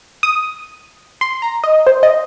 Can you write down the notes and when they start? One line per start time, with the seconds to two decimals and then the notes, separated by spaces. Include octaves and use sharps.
0.23 D#6
1.21 C6
1.42 A#5
1.64 D#5
1.87 C5
2.03 D#5